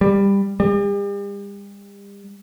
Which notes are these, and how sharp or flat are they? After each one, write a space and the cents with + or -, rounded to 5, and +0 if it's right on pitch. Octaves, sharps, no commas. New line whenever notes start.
G3 +15
G3 +40